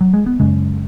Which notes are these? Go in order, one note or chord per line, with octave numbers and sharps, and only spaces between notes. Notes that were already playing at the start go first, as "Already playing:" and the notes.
F#3
G#3
B3
F#2 C#3 G#3 C#4